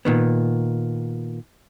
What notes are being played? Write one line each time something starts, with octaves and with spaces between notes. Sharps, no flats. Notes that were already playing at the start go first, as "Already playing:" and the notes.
A#2 D#3 B3